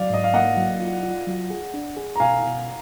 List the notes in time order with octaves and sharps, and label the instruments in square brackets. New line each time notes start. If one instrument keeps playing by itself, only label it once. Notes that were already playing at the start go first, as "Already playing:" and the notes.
Already playing: [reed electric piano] F#3 [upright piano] D5 F5
[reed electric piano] G#2 [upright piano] D#5
[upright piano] F5
[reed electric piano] A#3 [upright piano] D#5 F#5
[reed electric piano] F#3
F4
F4
F#3
G#4
D4
G#4
[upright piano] A#5
[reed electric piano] B2 [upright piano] F5 G#5
[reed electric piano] B2